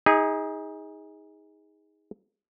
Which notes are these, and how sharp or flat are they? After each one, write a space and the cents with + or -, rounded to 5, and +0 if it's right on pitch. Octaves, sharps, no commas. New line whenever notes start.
D#4 +25 G#4 -20